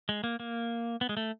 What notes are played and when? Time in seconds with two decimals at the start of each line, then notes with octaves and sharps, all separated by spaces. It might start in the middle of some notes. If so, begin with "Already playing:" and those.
0.09 G#3
0.24 A#3
0.40 A#3
1.01 B3
1.09 G#3
1.17 A3